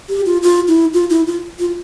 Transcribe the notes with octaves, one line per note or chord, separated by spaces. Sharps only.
G4
F4
F4
E4
F4
E4
F4
F4